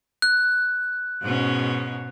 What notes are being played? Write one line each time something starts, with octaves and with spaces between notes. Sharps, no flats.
F#6
G#2 B2 C#4